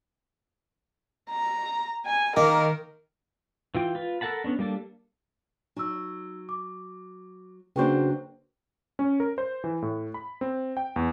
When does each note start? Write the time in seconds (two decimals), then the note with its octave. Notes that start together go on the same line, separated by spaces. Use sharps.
1.31 A#5
2.05 G#5
2.37 D#3 A#3 A#4
3.75 E3 F4 G5
3.95 F4 B4
4.21 A4 A#4 F#5 A5 B5
4.44 B3 C#4 D4
4.59 G3 A#3 D4 A4
5.77 F#3 D#4 E6
6.49 D6
7.76 C#3 F#3 A#3 D4 F#4 B4 C5 G5
8.99 C#4
9.20 A#4
9.38 C5
9.64 E3
9.82 A2
10.14 B5
10.41 C4
10.77 G5
10.96 E2